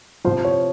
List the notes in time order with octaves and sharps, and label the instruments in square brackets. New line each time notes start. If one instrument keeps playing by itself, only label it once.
[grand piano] C3 F3 C5
C#5